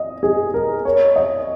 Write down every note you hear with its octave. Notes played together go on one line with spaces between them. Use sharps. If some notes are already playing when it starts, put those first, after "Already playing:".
Already playing: D#5
G#4
A#4
C#5
D#5